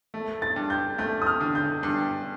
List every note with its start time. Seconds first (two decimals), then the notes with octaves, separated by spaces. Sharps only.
0.14 A3
0.42 A6
0.56 G2
0.70 G6
0.98 A3 G6
1.22 D#6
1.27 F6
1.40 D3
1.55 G6
1.83 G2